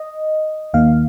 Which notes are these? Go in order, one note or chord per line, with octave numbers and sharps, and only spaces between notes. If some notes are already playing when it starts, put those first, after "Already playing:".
Already playing: D#5
D#2 D#3 A#3 F5